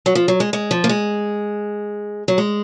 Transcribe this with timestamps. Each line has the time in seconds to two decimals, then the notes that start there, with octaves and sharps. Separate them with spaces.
0.06 F#3
0.15 F3
0.28 F#3
0.40 G#3
0.53 G#3
0.71 F3
0.84 A#3
0.89 G#3
2.28 F#3
2.38 G#3